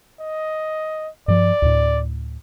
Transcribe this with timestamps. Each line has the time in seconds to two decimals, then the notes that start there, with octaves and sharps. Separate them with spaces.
0.20 D#5
1.28 G2 F3 D5
1.62 D2 A2